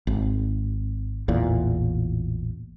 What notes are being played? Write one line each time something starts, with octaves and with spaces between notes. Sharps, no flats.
G#1
A1 E2 A#2